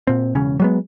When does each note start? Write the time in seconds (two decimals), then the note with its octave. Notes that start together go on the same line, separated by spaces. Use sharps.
0.07 A#2 C4
0.35 E1 C#3 C#4
0.60 F#3 G#3 B3